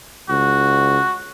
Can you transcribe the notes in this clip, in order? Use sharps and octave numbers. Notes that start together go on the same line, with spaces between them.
C#2 F#4